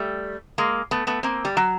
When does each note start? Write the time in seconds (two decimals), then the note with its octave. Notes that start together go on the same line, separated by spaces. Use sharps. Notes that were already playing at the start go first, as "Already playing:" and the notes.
Already playing: G3 A3
0.58 G#3 A#3
0.91 A3 B3
1.07 A3 B3
1.23 A#3 C4
1.45 G3
1.57 F#3